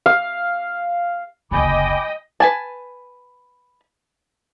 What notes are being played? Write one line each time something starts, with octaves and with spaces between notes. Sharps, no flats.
F5
F#1 D2 D#5 G5 G#5 B5 D6
B4 G#5 A5